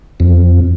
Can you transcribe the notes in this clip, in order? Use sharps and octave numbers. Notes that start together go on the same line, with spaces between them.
F2